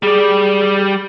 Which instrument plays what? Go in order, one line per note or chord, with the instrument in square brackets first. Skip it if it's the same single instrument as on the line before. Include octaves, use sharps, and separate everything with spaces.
[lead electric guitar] G3 D5 [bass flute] G#4